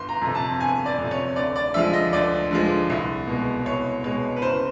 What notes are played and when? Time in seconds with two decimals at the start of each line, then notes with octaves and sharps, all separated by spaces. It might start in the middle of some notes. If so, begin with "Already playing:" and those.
Already playing: G1 C6
0.09 A#5
0.22 F2
0.27 C3
0.35 A5
0.60 G1 G#5
0.86 D5
0.98 F2 C3
1.11 C#5
1.36 D2 D5
1.56 D5
1.74 D3 F3 G#3 E5
1.93 D#5
2.13 D2 D5
2.51 D3 F3 G#3
2.90 C2
3.27 B2 G#3
3.65 C2 C#5
4.04 B2 G#3 C#5
4.36 B4
4.42 F#1 C5